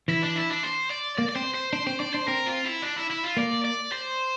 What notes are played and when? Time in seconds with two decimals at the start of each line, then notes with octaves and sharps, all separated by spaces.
0.08 E3 E4
0.22 D4
0.36 E4
0.50 D4
0.63 C5
0.90 D5
1.18 A#3 D5
1.29 D5
1.36 C4 C5
1.54 C5
1.73 D4 C5
1.87 C4 C5
2.00 D4 D5
2.14 D4 C5
2.28 C4 A#4
2.46 F4
2.65 E4
2.82 D4
2.96 E4
3.10 E4
3.23 F4
3.37 A#3 D5
3.64 D5
3.92 C5